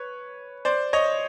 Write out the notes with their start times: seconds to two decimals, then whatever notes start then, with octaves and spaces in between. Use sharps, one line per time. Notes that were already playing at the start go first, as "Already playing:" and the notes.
Already playing: B4 C#5
0.65 C5 D5
0.93 C#5 D#5